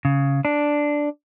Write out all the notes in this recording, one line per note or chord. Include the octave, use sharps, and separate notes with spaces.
C#3
D4